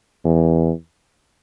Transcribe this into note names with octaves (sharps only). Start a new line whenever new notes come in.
E2